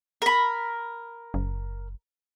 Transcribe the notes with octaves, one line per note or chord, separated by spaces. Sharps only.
A#4 B5
F#1